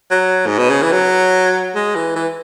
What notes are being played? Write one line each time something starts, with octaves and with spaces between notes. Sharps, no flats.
F#3
G#2
B2
C#3
E3
F#3
G#3
E3
E3